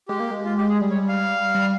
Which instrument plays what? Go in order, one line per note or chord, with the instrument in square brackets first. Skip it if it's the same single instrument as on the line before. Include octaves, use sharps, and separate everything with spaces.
[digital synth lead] G#3 [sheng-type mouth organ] G4
[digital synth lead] A#3
G#3
[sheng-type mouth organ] F4
G4
G#4
[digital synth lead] G3
[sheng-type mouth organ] C#5
F5
[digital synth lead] G3